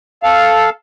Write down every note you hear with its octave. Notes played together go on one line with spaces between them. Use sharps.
A4 F5